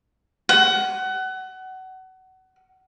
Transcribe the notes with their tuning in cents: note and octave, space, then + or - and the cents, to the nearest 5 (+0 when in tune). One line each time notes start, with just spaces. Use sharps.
F#5 +25